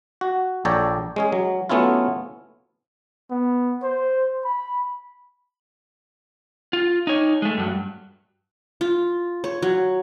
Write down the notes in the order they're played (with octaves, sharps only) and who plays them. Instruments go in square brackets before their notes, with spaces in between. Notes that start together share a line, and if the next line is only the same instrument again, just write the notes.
[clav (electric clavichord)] F#4
A#1 A4 C#5 D5 G5 A#5
G#3 C#4 G#4
F#3
F#3 A3 B3 C#4 E4 F4
[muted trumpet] B3
C5
B5
[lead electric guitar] F4
D#4 C#5
G#3 A3
G2 F#3
[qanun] F4
C#5
F#3